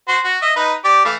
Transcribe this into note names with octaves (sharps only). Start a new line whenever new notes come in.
F#4 C5 C6
F#4
D#5 E5
D#4 B4
G4 D5 D6
E3 A3 F5